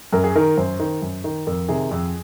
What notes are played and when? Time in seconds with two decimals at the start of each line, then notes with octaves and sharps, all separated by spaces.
0.13 F#2 A#4
0.24 G#4
0.35 D#3 A#4
0.57 F#2 C5
0.79 D#3
1.02 F#2
1.24 D#3
1.47 F2 A#4
1.68 C3 D#3 G#4
1.91 F2